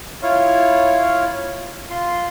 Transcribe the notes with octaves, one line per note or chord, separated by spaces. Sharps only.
E4 F4 C#5 F5
F4 C6